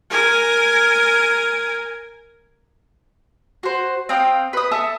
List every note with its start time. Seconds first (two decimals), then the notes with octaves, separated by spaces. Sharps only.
0.10 A#4 G#5
3.63 F#4 C5
4.09 C4 F5 G5 D#6
4.53 B4 D#6
4.71 A4 E5 A5 D#6